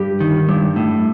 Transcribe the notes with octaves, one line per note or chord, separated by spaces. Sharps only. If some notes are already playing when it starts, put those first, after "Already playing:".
Already playing: G2 G4
D#3
G2
A2